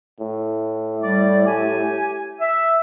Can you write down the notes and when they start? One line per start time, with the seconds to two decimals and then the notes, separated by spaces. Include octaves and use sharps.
0.20 A2
1.03 G3 D5
1.46 G4 G#5
2.41 E5